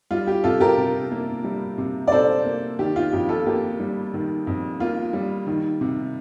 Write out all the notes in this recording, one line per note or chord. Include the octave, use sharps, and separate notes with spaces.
G3 F4
G4
C3 F4 A4
G4 A#4
C3
A#3
G3
C3
D5
C3 A4 C5
A#3
D#3 G4
F4
F2 G4
F4 A4
A#3 G4
G3
D#3
F2
A#3 F4
G3
D#3
C3